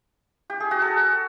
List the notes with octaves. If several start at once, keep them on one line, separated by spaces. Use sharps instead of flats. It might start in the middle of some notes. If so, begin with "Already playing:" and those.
G4
G#4
F#4
A4